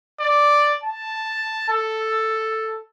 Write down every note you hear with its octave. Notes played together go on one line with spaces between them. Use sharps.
D5
A5
A4